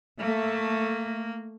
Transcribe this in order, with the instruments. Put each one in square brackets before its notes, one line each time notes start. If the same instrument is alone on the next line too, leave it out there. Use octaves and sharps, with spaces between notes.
[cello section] A3 [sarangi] A#3